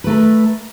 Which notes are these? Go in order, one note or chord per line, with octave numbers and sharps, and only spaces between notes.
A3 A#4 B4